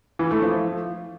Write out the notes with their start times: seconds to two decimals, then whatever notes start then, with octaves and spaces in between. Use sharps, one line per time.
0.19 E3
0.31 A3
0.42 F3